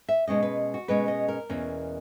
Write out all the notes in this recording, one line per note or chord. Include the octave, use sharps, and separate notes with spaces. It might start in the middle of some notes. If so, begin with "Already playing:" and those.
E5
B2 G#3 C#4 D#5
B4
F#4
B2 G#3 C#4 B4
D#5
A#4
E2 B2 A#3 C#4